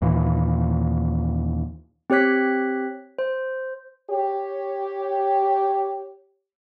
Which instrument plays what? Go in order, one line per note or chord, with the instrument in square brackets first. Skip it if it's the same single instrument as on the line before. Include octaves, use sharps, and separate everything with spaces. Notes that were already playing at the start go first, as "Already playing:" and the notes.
[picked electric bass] D#2 A#2 E3
[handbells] C4 G4 C#5 F#6 B6
C5
[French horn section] G4 C#5